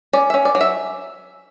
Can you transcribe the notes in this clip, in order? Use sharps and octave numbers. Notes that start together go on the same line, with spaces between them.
C#4 D5
E5
C#4
D5
F#3
E5